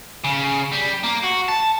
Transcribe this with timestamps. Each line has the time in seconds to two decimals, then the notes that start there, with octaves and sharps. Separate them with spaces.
0.25 C#3
0.72 G3
1.04 A#3
1.24 F#4
1.49 A5